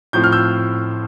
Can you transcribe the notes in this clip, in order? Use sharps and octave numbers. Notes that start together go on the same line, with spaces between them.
A2 F3 C4 G6
F6
E6 G6